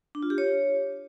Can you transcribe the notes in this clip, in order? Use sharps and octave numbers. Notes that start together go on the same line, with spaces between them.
D4
F4
G4
C#5